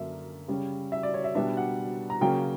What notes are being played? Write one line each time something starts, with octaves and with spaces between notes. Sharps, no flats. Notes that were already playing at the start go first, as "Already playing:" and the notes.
Already playing: F#2 D3 A#3 D4 E5
C#3 G3 C#4
E5
D5
C#5
E5
B2 G3 B3 D4 E5
F#5
A#5
C#3 F#3 A#3 C#4 G5